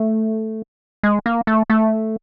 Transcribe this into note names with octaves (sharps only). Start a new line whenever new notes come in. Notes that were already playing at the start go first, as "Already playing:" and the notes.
Already playing: A3
G#3
A#3
A3
A3